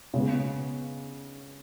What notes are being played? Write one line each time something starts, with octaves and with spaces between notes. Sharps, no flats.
C#3 G#3 B3